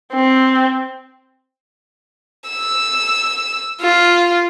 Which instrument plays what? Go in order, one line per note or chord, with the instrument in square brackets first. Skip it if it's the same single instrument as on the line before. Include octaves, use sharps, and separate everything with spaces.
[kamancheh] C4
[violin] E6
F4